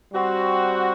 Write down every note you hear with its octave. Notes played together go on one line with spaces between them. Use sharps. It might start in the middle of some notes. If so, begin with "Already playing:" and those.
G3 C4 F#4 C5